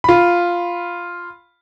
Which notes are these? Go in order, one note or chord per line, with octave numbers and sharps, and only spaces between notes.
F4 B5